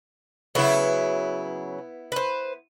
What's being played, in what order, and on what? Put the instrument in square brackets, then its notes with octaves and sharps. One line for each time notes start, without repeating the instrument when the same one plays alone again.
[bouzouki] C#3 F#3 [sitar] B3 E4
[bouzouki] B4 C5